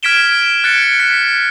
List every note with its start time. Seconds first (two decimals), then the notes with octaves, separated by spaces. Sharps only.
0.03 F6 G#6 B6 D7 E7 G7
0.64 F#6 G#6 A6 C#7 D7
1.00 B6